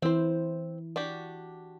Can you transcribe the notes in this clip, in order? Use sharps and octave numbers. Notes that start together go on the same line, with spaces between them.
E3 C4 E4 C5
D4 F#4 G4